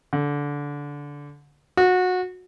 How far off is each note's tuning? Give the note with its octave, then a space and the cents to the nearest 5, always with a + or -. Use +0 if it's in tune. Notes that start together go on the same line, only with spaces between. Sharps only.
D3 -20
F#4 -20